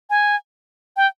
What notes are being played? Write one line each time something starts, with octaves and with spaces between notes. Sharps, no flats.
G#5
G5